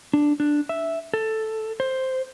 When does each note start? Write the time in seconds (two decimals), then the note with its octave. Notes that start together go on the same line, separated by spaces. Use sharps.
0.13 D4
0.40 D4
0.69 E5
1.14 A4
1.80 C5